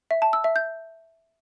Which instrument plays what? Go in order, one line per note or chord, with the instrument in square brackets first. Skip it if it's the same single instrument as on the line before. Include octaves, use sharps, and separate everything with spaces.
[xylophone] E5
A5
E6
E5
G6